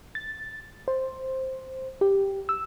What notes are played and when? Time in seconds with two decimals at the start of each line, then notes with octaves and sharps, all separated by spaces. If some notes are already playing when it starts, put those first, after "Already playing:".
0.15 A6
0.88 C5
2.01 G4
2.49 E6